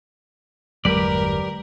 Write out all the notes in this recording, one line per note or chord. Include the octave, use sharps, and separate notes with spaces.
G1 E2 F#3 G#3 G4 A#4 B4 D5